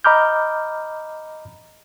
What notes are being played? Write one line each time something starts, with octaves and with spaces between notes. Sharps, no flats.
D#5 A#5 B5 D6 F6 G6